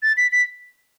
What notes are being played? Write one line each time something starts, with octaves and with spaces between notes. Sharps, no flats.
A6
B6
B6